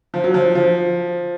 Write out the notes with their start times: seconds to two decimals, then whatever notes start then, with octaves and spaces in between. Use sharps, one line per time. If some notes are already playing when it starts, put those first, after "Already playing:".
0.14 F3
0.24 F#3
0.34 F3
0.55 F3